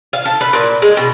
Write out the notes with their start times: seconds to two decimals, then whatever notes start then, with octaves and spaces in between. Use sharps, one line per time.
0.13 F5
0.25 A4
0.41 B4
0.53 A#2
0.82 G#3
0.97 B2